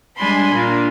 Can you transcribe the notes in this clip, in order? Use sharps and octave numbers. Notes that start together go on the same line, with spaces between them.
G3 G#3 D4 G#5 B5 C6
A#2 A#3 D4 F4